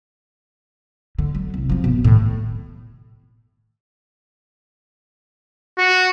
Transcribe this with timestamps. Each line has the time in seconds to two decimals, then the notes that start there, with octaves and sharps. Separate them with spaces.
1.18 D3
1.35 F#3
1.54 C2
1.70 F3 C4
1.84 B2
2.04 A2 D#3
5.79 F#4